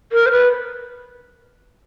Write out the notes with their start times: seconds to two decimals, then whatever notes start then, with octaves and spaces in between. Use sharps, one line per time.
0.12 A#4
0.26 C5
0.31 B4